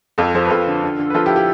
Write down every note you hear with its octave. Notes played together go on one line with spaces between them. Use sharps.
F2 F4 A4
F3 A4 C5
B4
F2 F4 A4
D3
D3
D3
B4
F3 F4 A4
E4 G4
E4 G4